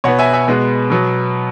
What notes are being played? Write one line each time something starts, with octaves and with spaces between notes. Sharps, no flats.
B2 B3 C#5 F#5
E5 G#5
E5 G#5
B2 G#3 B3
B2 F#3 B3